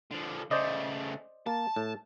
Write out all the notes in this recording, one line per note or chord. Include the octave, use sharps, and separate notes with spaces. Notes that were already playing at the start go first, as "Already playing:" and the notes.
D3 F3
C#3 A3 C5 D5 D#5
A#3 A5
A2